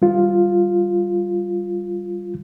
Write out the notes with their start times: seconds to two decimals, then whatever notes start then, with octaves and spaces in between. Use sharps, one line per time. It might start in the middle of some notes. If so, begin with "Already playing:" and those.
0.02 G3 F4